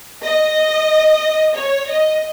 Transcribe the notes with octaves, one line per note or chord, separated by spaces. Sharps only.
D#5
C#5
D#5